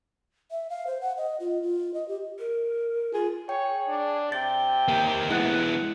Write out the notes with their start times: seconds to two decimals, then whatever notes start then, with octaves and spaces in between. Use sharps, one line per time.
0.51 E5
0.70 F5
0.87 C5
1.01 F#5
1.17 D#5
1.40 F4
1.62 F4
1.94 D#5
2.08 G4
2.39 A#4
3.14 F4 G#4
3.49 G#4 C#5 G5
3.88 D4
4.32 C3 G5 A6
4.88 A#3 G4
5.30 G#3 B3 E4 F#5 F#6